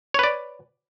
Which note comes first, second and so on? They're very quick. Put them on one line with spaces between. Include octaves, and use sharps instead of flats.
C#5 B4 D5